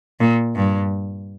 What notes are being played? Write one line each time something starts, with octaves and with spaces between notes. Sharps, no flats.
A#2
G2